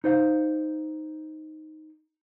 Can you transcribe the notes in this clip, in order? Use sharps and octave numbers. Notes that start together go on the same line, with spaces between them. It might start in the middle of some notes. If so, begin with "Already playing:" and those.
D#4 C5 F5